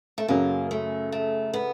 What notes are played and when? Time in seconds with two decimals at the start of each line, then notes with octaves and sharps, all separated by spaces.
0.18 A3
0.28 F#2 C#3 F#3 A#3
0.71 A3
1.12 A3
1.54 B3